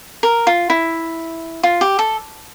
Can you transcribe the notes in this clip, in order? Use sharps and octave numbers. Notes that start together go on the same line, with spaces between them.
A#4
F4
E4
F4
G4
A4